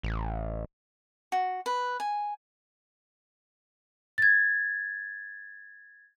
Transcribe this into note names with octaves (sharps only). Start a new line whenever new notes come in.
A1
F#4
B4
G#5
G#6 A6